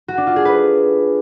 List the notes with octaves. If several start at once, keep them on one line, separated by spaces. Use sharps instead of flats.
F#4
D4
F4
G#4
B4